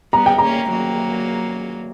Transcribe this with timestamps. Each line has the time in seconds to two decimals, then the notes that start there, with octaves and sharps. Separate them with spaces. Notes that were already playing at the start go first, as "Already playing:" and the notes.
0.13 G3 B3 A#5
0.26 G5
0.38 A#3 C#4 A#5
0.71 F#3 A#3